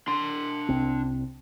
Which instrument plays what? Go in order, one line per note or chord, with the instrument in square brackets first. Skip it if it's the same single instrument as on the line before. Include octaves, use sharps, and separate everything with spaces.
[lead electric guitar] D4 C6
[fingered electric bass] C2 C4